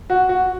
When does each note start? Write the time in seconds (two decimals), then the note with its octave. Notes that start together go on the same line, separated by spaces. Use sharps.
0.10 F#4
0.29 F#4